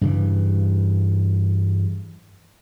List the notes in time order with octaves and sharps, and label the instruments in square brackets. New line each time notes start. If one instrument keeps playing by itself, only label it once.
[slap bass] G2 C#3 E3